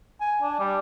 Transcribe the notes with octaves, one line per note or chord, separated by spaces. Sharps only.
G#5
D4
G3